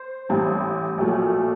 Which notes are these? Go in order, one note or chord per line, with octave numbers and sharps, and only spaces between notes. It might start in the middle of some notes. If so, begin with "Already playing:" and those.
Already playing: C5
A1 A2 G3
A#1 A#2 F#3 A3